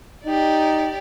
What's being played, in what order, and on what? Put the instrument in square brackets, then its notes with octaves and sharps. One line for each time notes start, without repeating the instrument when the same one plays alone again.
[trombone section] D#4 [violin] G4 D5